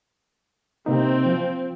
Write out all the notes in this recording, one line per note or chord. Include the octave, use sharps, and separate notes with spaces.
C3 A#3 C4 D#4
F3 F4